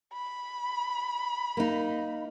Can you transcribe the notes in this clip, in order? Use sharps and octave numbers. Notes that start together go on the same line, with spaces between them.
B5
A#3 D#4